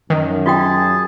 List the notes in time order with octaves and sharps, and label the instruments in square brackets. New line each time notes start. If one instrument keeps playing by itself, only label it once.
[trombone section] F#2 [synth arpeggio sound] D#3
[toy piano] F4 F#4 G5 [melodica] G#4 A5